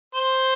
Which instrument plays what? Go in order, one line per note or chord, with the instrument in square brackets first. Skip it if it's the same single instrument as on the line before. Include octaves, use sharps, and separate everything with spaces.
[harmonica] C5